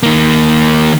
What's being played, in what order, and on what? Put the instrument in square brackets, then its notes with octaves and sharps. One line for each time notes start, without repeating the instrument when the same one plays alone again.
[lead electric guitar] D#3 A#3